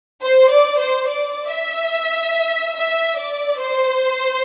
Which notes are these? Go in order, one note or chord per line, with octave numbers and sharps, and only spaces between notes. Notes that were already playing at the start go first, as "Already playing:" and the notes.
C5
D5
C5
D5
E5
E5
D5
C5